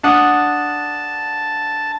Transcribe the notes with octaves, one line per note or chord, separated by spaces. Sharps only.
D4 F#5 A5 D#6